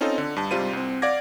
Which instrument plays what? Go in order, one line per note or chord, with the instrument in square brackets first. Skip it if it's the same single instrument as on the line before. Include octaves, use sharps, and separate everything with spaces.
[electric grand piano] C4 C#4 D#4 F4 A4 D#5
D3
G2 A5
G#2 C3 G3 F4 C5 D#7
C2 C4
D5 F5 F#5 D6 G#6 A#6